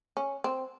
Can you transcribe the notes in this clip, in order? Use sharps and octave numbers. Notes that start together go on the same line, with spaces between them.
C#4
C4